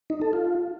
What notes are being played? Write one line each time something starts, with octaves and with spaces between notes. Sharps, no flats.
D#4
A4
F4